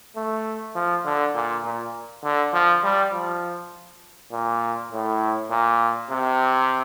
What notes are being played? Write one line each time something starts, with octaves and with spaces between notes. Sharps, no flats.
A3
F3
D3
A#2
A#2
D3
F3
G3
F3
A#2
A2
A#2
C3